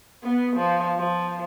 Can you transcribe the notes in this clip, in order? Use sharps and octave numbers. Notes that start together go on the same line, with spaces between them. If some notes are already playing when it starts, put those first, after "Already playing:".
B3
F3
F3